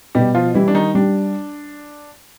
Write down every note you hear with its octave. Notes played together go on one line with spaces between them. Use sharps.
B2 G3 G4
F3 F4
E3 G3 E4
D4
D#3 D#4
G3 D4